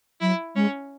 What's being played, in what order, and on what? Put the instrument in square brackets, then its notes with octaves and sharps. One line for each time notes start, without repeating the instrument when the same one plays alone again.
[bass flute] F#3 [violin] E4
[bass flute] G#3 [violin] C#4